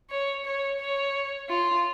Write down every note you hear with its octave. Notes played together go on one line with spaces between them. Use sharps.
C#5
C#5
C#5
F4